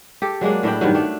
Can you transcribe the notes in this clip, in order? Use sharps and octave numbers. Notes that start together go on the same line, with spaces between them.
G4 A4
F#3 G#3 A#3 D4
A2 D4 E4 G5
G2 D#3 F#3
F#3 A3 D4